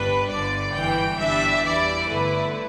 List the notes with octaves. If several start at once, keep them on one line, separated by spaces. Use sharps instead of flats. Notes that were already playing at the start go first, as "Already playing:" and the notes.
Already playing: G1 G2 G3 D4 B4
G1 G2 D3 D5
G1 G2 E3 G5
G1 G2 E3 G3 D4 E5
E2 E3 G3 E4 D5
G1 G2 D3 A3 E4 B4